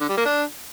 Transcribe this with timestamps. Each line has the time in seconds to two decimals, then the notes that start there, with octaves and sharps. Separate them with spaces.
0.01 D3
0.09 G3
0.17 A#3
0.26 D4